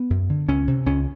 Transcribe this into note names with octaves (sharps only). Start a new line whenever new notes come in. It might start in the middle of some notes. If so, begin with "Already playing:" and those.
Already playing: B3
F#2
D3
C#2 C#4
C3
C#2 C#4